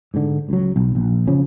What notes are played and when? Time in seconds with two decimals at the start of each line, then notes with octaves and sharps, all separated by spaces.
0.14 G#2 D3
0.49 C#2 F#3
0.76 B1
0.95 A#1
1.27 C#3 F3 C#4